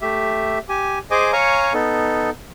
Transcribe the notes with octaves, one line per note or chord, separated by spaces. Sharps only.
A3 G4 E5
G4 G#5
G#4 C5 D#5 G#5 D6
C#5 F5 G#5 A#5 C#6
B3 D#4 A4